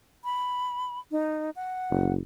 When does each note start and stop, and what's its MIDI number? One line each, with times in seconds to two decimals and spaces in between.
0.24 0.99 83
1.11 1.50 63
1.56 2.12 78
1.90 2.19 30